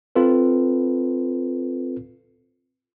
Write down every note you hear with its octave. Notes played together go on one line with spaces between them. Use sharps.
C4 F4 A4 B4